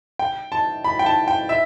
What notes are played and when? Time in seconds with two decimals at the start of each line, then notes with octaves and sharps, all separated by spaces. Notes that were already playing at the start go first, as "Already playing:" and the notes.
0.19 G5
0.52 A5
0.84 B5
0.99 G5
1.06 A5
1.28 G5
1.49 E5